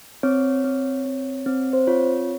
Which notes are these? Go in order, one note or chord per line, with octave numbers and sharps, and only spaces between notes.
C4 C#5
C4
C4
C4
C5
F4 C#5